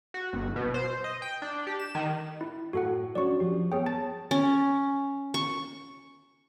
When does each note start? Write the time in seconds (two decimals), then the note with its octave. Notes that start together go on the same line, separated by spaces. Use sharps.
0.14 F#4
0.33 G1
0.56 B2
0.74 C5
1.04 D#5
1.22 G5
1.42 D4
1.67 G4
1.79 E7
1.95 D#3
2.41 E4
2.73 A2 F#4 A4 F#5
3.15 C#4 D4 F#4 D5 C#6
3.40 F3 G4
3.72 B3 G#4 C#5 G5
3.86 A5 A6
4.31 C#4
5.34 C#6